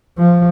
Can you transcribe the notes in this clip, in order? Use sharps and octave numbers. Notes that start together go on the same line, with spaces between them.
F3